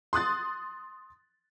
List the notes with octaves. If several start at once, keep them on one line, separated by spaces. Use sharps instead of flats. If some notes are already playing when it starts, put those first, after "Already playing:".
C6 D#6 F#6 A6